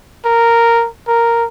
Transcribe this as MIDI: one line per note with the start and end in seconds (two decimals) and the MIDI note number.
0.25 0.87 70
1.07 1.45 70